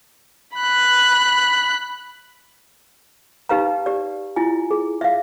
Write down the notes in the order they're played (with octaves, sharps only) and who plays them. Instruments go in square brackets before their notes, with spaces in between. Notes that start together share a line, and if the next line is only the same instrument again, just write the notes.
[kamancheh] B5 F#6
[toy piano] D#4 G4 B4 F5 A#5
G4 D5
E4 F4 G#5
G#4
E5 F5